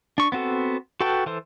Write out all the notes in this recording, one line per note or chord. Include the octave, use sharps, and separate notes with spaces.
D4 C#6
B3 C4 F#4 A4
F#4 A4 B4 G5 A5
E3 A4 C5